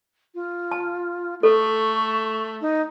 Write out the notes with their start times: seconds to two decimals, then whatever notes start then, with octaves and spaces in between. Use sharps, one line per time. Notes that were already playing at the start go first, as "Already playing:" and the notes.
0.35 F4
0.71 A5
1.43 A3 A4 C#6
2.61 D#4